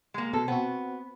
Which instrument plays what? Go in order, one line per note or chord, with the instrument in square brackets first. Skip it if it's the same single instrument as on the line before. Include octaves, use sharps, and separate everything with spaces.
[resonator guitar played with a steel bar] G#3 A#3
[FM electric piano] B2 [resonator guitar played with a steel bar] A4
[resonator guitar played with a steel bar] B3 [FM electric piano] C4 F#4